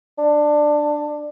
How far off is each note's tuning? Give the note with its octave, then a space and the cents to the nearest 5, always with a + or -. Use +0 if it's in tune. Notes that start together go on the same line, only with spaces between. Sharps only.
D4 +15